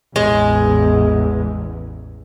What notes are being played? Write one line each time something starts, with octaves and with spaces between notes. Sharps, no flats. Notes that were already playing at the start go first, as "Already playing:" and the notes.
A1 E2 G#3